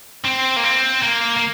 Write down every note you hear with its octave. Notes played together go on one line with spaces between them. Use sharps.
C4
A#3
C4
A#3
A#3